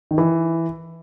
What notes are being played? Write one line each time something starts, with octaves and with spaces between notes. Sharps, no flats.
D#3
E3